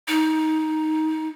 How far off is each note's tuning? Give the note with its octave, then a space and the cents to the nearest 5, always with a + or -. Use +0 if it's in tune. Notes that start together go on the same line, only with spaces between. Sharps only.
D#4 +15